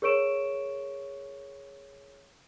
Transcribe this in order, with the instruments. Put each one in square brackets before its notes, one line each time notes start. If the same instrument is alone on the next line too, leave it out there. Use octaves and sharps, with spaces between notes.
[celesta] G#4 A#4 C#5 C#6 D7 E7